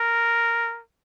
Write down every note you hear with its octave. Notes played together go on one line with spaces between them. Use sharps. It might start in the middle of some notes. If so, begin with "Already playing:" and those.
Already playing: A#4